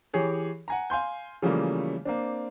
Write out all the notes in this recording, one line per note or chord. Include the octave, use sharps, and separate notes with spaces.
E3 G4 G#4 C#5
F#5 G#5 A#5
F5 G#5 C6 G6
C#3 E3 F3 G3 A3 A#3
A#3 C4 D4